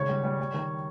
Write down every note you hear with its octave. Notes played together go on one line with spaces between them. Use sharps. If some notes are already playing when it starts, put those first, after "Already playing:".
Already playing: G#1 C#3 C#5
G3
G3
G3
D#3